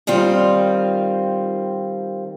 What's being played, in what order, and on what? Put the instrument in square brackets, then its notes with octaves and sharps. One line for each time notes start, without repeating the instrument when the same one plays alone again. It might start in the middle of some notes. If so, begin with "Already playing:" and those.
[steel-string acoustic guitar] D#3 G3 C4 F4